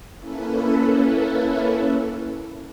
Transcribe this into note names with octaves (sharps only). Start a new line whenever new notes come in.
A#3 C#4 E4 A4 B4